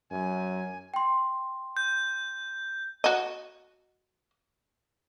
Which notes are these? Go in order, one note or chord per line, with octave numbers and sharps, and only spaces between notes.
F#2 G#5
G5 C6
G6
F#4 D#5